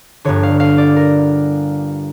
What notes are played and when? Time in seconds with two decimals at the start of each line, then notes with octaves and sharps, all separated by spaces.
0.25 G1 G2 D3 C#5
0.43 F5
0.60 F5
0.78 D5
0.96 A#4